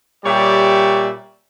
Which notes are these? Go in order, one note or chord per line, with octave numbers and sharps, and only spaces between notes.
A#2 G3 G4 C#5 D5 E5